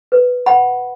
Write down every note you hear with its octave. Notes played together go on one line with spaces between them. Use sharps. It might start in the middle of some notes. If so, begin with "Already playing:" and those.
B4
F#5 B5